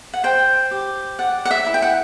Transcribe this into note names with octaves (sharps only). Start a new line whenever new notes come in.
F#5
C5 G5
G4
D5 F#5
F#5
E5
E4
G5
F#5